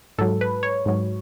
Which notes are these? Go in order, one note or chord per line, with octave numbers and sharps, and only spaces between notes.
G#2 F#3 A4
B4
C#5
G#2 F#3